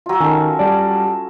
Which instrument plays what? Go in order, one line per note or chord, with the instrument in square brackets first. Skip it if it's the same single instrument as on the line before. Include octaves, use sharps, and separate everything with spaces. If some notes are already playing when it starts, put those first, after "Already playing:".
[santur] F#3 F4
[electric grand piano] D#3 [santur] C#4 A4
[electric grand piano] G3 D5 [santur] A5